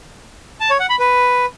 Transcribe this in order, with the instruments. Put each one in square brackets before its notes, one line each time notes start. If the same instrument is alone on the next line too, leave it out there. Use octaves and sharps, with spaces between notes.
[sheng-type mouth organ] A5
C#5
F#5
B5
B4